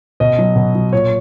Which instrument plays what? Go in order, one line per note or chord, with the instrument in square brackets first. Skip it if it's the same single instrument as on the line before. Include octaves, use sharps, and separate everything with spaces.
[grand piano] B2 D#5
F#3
B2
F#3
A#2 C#5